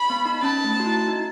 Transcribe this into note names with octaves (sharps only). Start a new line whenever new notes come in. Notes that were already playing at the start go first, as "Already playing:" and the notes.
Already playing: B5
B3
D#4
C#4 A5
A3
F#4
E4
D#4